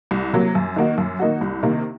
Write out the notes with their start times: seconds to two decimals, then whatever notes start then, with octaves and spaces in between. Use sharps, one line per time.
0.11 C2
0.33 C3 F#3 A#3
0.55 F#2
0.76 D#3 A#3 D#4 F#4
0.98 F#2
1.19 D#3 A#3 D#4 F#4
1.41 C2
1.63 C3 D#3 A#3